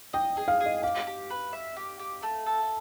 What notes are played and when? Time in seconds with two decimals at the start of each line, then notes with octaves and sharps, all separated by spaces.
0.13 D#5 G5
0.37 G#4
0.48 F5
0.60 G#4
0.66 D#5
0.83 G4 F5
1.07 G4
1.30 B4
1.53 E5
1.76 G4
1.99 G4
2.23 A3
2.46 A4